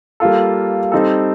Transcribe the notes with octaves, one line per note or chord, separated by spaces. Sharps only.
G3 A#3 F4 A4
G3 C4 D#4 A4